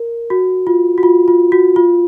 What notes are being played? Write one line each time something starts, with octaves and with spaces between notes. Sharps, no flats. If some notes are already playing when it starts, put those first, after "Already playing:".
Already playing: A#4
F#4
F4
F#4
F4
F4
F#4
F4